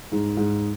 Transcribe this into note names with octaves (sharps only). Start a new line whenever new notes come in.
G#2
G#2